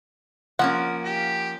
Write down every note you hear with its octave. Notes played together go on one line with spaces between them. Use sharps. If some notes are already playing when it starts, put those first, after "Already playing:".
F3 A#3 C#4 F#5
G4